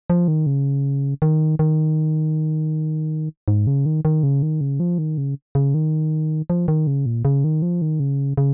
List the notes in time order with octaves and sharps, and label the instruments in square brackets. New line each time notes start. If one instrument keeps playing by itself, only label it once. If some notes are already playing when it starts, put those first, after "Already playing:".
[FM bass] F3
D#3
C#3
D#3
D#3
G#2
C#3
D#3
D#3
C#3
D#3
C#3
F3
D#3
C#3
C#3
D#3
F3
D#3
C#3
A#2
C#3
D#3
F3
D#3
C#3
C#3